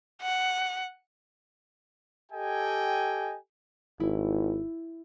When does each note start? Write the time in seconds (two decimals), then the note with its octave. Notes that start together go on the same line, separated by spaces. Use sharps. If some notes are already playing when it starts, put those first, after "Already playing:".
0.21 F#5
2.32 G4 A4 D#5 G5 G#5
4.00 G#1 E4